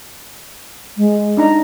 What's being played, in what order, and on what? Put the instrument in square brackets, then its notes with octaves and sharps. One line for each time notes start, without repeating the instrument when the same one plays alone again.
[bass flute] G#3
[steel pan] D4 D#4 A#5